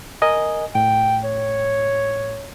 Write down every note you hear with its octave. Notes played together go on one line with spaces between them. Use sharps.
A#4 D#5 G#5
A2 G5
C#5